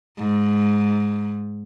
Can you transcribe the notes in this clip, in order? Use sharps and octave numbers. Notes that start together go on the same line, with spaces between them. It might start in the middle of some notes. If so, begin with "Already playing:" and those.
G#2